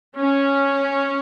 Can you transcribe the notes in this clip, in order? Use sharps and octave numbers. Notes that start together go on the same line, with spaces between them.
C#4